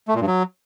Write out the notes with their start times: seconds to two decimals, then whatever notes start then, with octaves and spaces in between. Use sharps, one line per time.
0.08 A3
0.14 A#2
0.21 G2
0.27 F#3